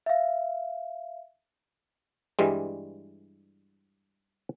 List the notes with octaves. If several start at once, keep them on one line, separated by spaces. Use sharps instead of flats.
E5 F5
G2 E3 G3 G#3